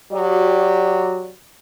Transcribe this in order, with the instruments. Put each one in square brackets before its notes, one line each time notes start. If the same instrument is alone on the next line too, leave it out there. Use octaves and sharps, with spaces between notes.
[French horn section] F#3 F#4 G4 D5